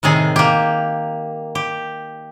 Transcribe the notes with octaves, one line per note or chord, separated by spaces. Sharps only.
A2 C3 D#3 G#4
A#3 G4
G4